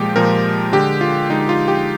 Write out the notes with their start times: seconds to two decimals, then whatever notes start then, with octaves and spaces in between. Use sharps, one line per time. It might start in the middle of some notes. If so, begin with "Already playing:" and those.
Already playing: A#2 F3 G#3 G4
0.16 A#2 F3 G#3 A#4
0.73 D3 G#3 G4
1.01 F4
1.29 D3 G#3 D#4
1.49 F4
1.68 G4